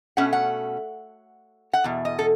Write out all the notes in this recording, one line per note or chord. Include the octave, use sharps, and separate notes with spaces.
B2 A3 C#4 F#5
F#5
F#5
E2 B2
D#5
A4